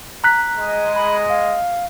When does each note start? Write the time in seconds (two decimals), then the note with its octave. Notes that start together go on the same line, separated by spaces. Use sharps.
0.24 A#5 F#6 B6
0.57 G#3 D#5
0.95 B5
1.29 F5